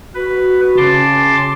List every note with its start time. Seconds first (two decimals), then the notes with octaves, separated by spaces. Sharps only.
0.15 F#4 B4
0.77 C#3 A5 C6 D6